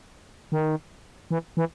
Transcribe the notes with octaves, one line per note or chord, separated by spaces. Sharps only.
D#3
E3
E3